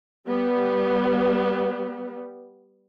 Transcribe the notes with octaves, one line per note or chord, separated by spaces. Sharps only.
G3 B3